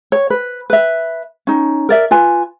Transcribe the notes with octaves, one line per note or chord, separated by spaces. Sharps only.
C#5
B4
B4 E5
C#4 D#4
A#4 D5 E5
F4 B4 G#5